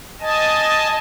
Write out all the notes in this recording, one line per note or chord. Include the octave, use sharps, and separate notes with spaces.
D#5 G#5 A5